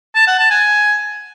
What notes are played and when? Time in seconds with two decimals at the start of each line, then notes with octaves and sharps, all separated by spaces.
0.15 A5
0.27 F#5
0.39 A5
0.50 G#5